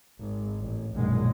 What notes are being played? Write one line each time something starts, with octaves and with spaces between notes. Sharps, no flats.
G#1
A1
A#1 F#2 B2 D#3 G#3